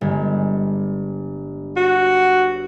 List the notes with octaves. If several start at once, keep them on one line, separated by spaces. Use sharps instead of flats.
G1 G#3
F#4